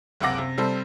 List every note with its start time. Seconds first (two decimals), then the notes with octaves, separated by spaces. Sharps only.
0.21 F#1 C#2 C3 F#5 D6 A#6
0.38 C3
0.58 C3 G3 C4 A4